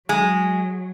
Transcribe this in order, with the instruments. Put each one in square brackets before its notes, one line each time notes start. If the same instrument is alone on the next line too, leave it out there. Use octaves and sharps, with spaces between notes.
[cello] F#3 [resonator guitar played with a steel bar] G#3